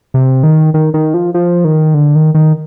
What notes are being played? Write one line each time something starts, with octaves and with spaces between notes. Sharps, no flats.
C3
D#3
D#3
D#3
F3
F3
D#3
D3
D#3
D#3